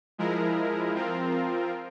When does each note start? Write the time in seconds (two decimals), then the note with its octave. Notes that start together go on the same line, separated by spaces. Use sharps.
0.18 F3 G#3 E4 A#4
0.95 F3 C4 F4 A#4